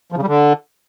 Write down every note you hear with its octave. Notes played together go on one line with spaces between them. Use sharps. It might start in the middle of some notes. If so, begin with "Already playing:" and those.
F3
C#3
G3
D3